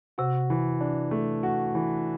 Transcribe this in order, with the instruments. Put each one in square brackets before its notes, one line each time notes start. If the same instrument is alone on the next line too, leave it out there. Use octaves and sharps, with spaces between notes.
[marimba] C3 [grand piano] F#4
[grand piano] E3
D4
A3
F#4
E3